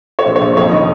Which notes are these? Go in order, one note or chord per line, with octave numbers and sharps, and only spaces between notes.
C#5
A#1 C5
C#5
A#1 C5
F2 C#5
D#3 D#5